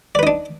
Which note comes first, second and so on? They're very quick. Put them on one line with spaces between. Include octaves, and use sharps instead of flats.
D5 B4 D#4 D4